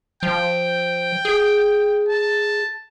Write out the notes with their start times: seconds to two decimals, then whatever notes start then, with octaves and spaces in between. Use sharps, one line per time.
0.23 F3 G5
1.25 G#4
2.09 A5